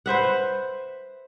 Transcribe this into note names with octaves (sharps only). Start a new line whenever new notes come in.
B4 C5 E5 F#5